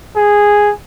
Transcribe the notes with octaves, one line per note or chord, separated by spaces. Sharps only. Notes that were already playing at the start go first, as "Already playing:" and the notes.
G#4